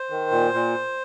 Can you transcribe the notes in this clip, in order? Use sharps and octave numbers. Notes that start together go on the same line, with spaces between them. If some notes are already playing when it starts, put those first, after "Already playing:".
Already playing: C5
D#3
A#2
A#2